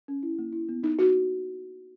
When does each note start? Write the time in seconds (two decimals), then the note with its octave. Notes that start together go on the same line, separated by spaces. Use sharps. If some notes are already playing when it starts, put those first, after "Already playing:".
0.08 C#4
0.23 E4
0.39 A#3
0.53 E4
0.69 B3
0.84 D#4
0.99 F#4